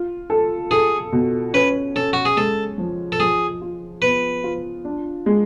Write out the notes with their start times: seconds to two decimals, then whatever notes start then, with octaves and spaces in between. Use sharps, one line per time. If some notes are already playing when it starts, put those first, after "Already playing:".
Already playing: F4
0.30 A4
0.71 G#4 A4
1.12 B2
1.53 C#4 B4
1.95 C#4 A4
2.13 F#4
2.25 G#4
2.37 G#3 A4
2.78 F3
3.12 A4
3.20 F3 G#4
3.61 F4
4.02 B3 B4
4.44 F4
4.85 D4
5.26 G#3